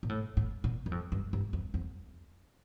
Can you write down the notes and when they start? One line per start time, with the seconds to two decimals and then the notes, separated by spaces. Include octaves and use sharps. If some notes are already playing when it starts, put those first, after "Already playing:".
0.03 A#2
0.09 A2
0.37 A2
0.64 A#2
0.86 F#2
0.92 F2
1.12 G2
1.33 G2
1.53 F2
1.74 F2